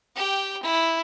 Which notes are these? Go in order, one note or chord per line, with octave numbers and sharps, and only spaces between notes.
G4 G5
E4